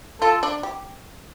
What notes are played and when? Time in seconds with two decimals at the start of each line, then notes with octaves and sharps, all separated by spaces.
0.22 F4 A4
0.43 D4
0.63 G4